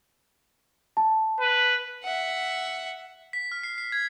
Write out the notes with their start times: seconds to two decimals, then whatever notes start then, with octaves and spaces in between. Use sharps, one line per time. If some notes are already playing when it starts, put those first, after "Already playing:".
0.97 A5
1.40 B4
2.03 E5 F#5
3.33 B6
3.52 F6
3.63 C7
3.78 C7
3.92 G#6